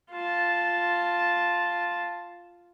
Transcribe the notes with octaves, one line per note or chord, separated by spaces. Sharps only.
F4 A5